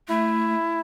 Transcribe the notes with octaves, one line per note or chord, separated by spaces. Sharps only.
A3 E4